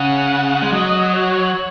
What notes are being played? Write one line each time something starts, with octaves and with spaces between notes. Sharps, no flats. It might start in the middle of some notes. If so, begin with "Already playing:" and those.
Already playing: C#3 F#5
G#3
F#3 D#5
C#5